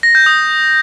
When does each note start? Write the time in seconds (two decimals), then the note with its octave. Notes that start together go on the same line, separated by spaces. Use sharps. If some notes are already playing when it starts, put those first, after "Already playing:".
0.03 A#6
0.15 G6
0.26 D#6